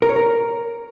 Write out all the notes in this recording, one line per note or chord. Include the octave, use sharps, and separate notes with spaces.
A#4
C#5
A#4